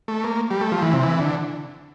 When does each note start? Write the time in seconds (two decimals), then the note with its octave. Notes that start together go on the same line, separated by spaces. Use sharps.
0.08 A3
0.24 A#3
0.51 G3
0.61 A3
0.72 F3
0.82 E3
0.93 C3
1.03 E3
1.19 D3